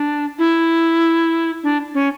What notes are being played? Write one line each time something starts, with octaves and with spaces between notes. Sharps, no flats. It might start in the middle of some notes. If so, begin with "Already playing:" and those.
Already playing: D4
E4
D4
C#4